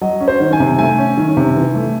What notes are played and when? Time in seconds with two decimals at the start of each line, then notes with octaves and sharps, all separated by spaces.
0.01 F#3 D#5
0.20 C#4
0.28 C5
0.40 D#3
0.53 G#5
0.60 C3
0.78 A3 G#5
0.98 C#4
1.17 D#3
1.37 C3
1.56 E3
1.75 A3